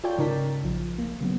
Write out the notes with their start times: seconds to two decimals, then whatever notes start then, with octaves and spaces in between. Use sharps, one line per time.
0.04 F4 A4 C#5 D5 G5 G6
0.18 G#2 C#3 D#4 A#4 A5 B6
0.64 A#1 F3
0.98 A#3
1.21 C#3 F#3 B3